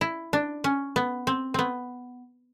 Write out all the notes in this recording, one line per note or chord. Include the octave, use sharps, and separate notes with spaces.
E4
D4
C#4
B3
C4
B3 C4